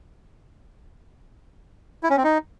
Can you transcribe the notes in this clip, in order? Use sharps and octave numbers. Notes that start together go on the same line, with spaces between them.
E4
C#4
C4
D#4